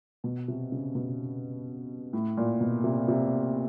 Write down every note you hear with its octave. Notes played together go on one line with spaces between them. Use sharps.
B2
C3
C#3
B2
A2
A#2
B2
C3
C3